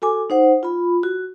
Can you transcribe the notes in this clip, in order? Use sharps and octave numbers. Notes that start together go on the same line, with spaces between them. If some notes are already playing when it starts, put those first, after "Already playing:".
F#4 A4 G#5 D6
D#4 C5 F#5
F4 B5
F#4